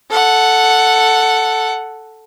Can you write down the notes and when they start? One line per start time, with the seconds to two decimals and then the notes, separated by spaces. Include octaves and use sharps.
0.10 A4 F#5